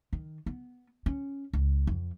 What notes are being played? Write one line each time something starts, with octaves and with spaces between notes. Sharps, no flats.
D#3
B3
C#4
C#2
F2